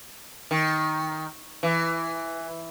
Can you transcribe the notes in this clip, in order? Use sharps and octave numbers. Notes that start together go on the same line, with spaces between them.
D#3
E3